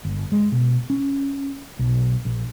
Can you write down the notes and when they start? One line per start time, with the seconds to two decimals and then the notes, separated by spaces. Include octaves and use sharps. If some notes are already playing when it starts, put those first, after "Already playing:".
0.05 G1
0.32 G#3
0.52 B2
0.90 C#4
1.79 B1
2.25 A#1